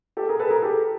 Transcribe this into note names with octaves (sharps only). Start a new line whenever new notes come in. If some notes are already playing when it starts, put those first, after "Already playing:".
G4 A4
G#4 A#4
A4 B4
G#4 A#4
G4 A4